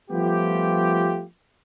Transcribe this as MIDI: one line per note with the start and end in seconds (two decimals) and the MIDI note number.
0.11 1.24 53
0.11 1.24 55
0.11 1.24 57
0.11 1.24 59
0.11 1.24 65
0.11 1.24 67